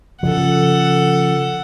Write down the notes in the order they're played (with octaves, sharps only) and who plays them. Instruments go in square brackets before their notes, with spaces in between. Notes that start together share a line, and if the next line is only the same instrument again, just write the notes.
[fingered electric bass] C#3 F3 [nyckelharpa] A4 F#5